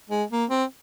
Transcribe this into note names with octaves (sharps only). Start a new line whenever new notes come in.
G#3
A#3
C4